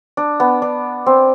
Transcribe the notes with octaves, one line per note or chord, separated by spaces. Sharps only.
D4
B3
D4
C4